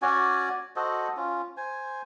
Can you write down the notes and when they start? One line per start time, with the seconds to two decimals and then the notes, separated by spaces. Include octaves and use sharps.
0.02 C#4 F#4 D5 G#5
0.76 F#4 A4 C5 D#5
1.17 C#4 F4
1.57 C5 G#5